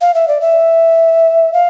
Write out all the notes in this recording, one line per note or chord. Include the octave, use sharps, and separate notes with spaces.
F5
E5
D5
E5
F5